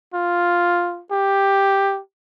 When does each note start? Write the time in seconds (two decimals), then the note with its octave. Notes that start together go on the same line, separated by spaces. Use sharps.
0.14 F4
1.12 G4